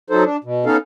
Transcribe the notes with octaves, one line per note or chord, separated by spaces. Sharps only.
F#3 D#4 A4 C5
D4
B2
B3 C#4 D#4 A4 F5